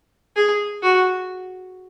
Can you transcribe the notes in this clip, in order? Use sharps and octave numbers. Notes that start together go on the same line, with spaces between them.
G#4
F#4